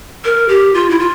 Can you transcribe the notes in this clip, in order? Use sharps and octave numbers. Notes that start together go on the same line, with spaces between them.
A#4
G4
F4
E4
F4